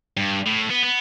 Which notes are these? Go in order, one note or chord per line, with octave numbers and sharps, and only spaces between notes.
G2
A2
B3
B3